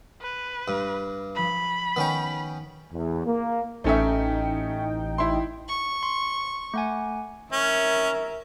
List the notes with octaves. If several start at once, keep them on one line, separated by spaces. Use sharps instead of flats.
B4
G2
F3 B5 E6
D#3 B3 C#4 C#5 G5
E2
A#3
A1 A3 C#4 D#4 E5 G5
E4 C6
C#6
C6
A3 F#5 G#5
C#4 A#4 E5